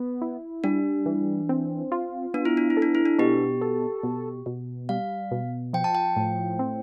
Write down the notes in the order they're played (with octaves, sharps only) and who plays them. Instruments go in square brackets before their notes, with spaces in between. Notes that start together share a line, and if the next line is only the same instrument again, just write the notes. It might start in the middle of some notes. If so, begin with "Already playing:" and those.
Already playing: [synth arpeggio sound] B3
E4
[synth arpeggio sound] G3 [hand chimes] D4
[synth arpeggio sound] E3
C4
F4
[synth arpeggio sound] B3 [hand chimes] D4
[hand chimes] E4
D4
E4
[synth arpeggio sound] A4
[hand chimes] D4
E4
D4
[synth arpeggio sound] B2 [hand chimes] G4
[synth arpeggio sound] A4
B2
B2
[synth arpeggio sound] G3 [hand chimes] F5
[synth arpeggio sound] B2
[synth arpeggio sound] F3 [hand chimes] G5
[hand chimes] A5
G5
[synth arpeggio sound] A2
C4